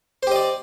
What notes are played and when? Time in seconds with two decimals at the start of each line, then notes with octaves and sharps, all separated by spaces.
0.23 C5
0.27 G4
0.31 D#5
0.36 D5